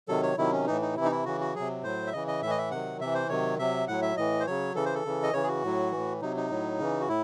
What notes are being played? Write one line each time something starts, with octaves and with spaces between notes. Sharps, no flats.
C3 D#3 F#3 A4
C#5
C3 D#3 F#3 E4
C#4
A2 E3 D#4
D#4
C3 E3 E4
D#4
E4
C#3 E3 F#4
F#4
C3 F#3 G#4
A2 F#3 C5
E5
C#3 E3 D#5
D#5
A2 E3 D#5 E5
E5
C3 D#3 F#3 F#5
C3 E3 E5
C5
C3 D#3 F#3 C#5
C3 F#3 E5
A2 F#3 F#5
E5
A2 E3 D#5
C5
C#3 F#3 C#5
C#3 E3 A4
C5
A4
C#3 E3
D#5
C#3 E3 C#5
G#4
F#4
A2 F#3
A2 E3
C3 F#3 D#4
D#4
A2 F#3
C#3 E3
F#4
A2 E4